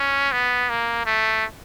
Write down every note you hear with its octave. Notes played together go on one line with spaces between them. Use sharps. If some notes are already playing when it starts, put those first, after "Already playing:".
Already playing: C#4
B3
A#3
A3